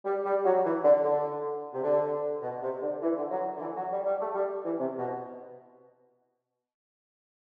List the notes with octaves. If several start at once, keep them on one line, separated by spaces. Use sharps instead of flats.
G3
G3
F#3
E3
D3
D3
C3
D3
B2
C3
D3
E3
D3
F#3
D3
E3
F#3
G3
G3
A3
G3
E3
C3
B2